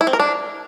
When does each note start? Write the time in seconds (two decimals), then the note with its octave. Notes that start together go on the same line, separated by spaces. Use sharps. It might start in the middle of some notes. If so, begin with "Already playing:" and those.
0.01 E4
0.07 C4
0.13 A#4
0.20 D4